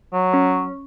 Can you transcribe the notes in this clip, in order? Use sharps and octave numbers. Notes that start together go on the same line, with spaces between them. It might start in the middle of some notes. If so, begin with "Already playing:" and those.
F#3
C#4